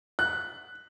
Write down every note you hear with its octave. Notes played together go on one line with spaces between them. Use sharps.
F#6